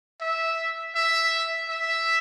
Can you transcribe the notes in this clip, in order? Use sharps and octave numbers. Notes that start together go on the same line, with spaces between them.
E5
E5
E5